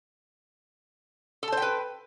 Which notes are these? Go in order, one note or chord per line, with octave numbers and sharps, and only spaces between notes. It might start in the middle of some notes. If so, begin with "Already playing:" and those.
A4 B4 C5 G5 A5